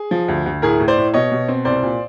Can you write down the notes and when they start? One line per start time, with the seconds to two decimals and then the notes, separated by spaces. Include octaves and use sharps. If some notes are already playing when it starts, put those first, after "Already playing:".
Already playing: G#4
0.11 F3
0.28 D2
0.46 D2
0.62 A2 G#4 A#4
0.80 A2
0.88 C5 D5
0.97 A2
1.13 B2 C#5 D#5
1.31 B2
1.48 C4
1.65 C2 C5 D5
1.83 A#2